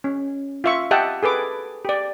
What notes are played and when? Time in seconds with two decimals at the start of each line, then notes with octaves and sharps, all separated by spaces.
0.04 C#4
0.64 F4 E5 C#6
0.91 G4 D#5 E5 F#5 G5 A5
1.23 G#4 A4 B4 D6
1.85 G4 D5